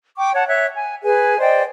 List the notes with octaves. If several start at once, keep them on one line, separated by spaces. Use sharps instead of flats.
G5 C#6 D6
C#5 F#5 A5
C#5 E5 F#6
G#5
G#4 B4 G#5
C5 D5 D#5 G5